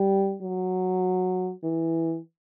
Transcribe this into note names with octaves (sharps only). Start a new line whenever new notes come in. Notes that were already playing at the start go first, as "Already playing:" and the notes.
Already playing: G3
F#3
E3